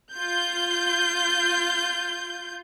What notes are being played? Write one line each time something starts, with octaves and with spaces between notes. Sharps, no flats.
F4 G6